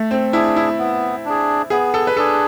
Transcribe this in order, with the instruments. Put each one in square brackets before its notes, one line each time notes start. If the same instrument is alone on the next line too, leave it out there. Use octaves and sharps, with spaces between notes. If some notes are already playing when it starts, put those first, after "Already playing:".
Already playing: [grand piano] A3
C4
[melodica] D4 G#4 [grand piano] E4
[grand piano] E4
[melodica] B3
D4 G#4
[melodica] B3 [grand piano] G#4
[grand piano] A4
B4
[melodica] D4 G#4 [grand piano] A4